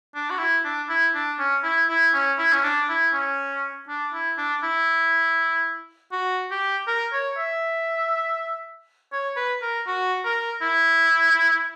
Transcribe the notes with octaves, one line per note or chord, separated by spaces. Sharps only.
D4
F#4
E4
D4
E4
D4
C#4
E4
E4
C#4
E4
C#4
D4
E4
C#4
D4
E4
D4
E4
F#4
G4
A#4
C#5
E5
C#5
B4
A#4
F#4
A#4
E4